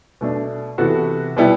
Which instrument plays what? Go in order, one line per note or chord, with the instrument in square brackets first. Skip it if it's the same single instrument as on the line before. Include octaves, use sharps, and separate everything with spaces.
[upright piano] B2 A3 D4
C3 E3 B3 F#4 A4
B2 G3 B3 E4 G4